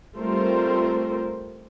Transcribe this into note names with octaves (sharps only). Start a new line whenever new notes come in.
G3 A3 C4 F4 A#4 C5